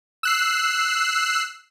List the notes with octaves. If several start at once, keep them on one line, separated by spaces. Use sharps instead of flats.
E6 F#6 C7